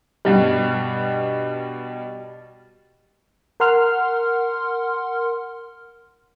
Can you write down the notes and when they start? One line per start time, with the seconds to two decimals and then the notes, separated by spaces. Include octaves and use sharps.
0.25 G2 B2 G3
3.60 A#4 F#5 C6 F6